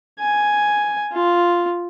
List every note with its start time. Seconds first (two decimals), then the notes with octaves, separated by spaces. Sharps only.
0.20 G#5
1.13 F4